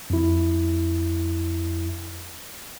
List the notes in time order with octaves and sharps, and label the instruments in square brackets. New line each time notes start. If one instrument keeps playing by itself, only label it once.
[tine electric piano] F2 E4